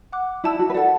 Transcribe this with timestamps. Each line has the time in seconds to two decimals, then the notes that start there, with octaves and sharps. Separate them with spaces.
0.12 F#5 D6 F#6
0.44 E4 D5 A5 E6
0.59 F#4
0.70 B4
0.74 A4 D5 F#5 A5